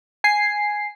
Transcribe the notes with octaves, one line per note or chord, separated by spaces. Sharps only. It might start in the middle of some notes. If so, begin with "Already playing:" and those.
G#5 C7